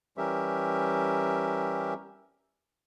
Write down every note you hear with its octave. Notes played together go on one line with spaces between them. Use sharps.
E3 G3 C#4 G4 A#4 E5